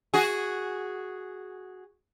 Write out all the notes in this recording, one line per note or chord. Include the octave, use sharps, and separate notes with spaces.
F#4 G#4